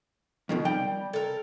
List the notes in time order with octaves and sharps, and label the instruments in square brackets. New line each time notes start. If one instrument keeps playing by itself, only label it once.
[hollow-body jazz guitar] F2 B2 D#3
[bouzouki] G3 [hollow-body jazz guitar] G5
[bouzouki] A4 A#4